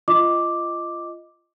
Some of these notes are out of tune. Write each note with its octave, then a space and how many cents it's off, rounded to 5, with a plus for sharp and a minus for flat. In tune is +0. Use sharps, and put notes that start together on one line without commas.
F4 -20 D#5 +0 D6 +0